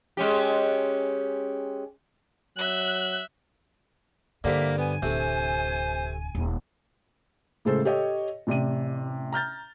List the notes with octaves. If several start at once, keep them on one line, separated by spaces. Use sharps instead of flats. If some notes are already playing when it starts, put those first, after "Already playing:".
G#3 C#4 G4
F#3 E5 F#6
G2 D3 G3 A#3 C5 E5
B3 G#5
D1 C3 A3 C5
D#1
A2 C#3 G#3 A4 C5
G4 A4 C#5 D#5
A1 C3 D5 D#7
A#5 F6 G6 A6